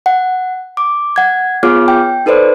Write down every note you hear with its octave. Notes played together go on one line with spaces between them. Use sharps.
F#5
D6
F#5 G#6
B3 F4 G#4 C#5 D6 F6
G5
D#4 A4 B4 C5 D5